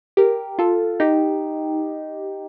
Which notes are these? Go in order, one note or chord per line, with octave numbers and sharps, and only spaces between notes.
G4 A#4
F4 A4
D#4 G4